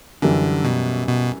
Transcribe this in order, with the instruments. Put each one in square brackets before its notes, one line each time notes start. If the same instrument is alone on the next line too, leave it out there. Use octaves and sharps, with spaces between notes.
[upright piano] F#2 E3 G3 [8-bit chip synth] D3
[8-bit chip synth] B2
B2